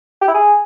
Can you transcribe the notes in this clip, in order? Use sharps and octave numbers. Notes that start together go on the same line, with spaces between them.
G4
E4
G#4